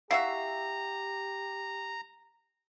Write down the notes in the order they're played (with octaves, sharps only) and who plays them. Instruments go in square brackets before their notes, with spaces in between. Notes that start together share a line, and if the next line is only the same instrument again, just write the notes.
[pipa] E4 F#4 E5 [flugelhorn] G4 [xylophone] F5 C7 [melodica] A#5